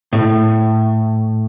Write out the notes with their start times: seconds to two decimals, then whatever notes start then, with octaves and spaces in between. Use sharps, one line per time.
0.13 A2